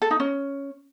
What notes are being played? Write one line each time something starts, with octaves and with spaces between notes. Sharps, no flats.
A4
D#4
C#4